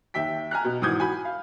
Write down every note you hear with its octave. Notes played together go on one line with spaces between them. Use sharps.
D#2 E5 G5 B6
G#5 A#5 F6 F#6
B2
G#1 E3 F#4 D#6 G6 G#6
F#4 G#5 B5
F5